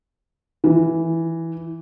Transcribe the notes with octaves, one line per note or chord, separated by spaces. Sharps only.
E3